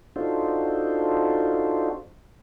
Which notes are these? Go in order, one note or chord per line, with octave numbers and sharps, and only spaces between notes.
D4 D#4 F4 F#4 A4 C5